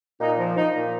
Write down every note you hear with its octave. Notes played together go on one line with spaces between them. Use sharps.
A#2 D#4
F3
F3 D#4
A#2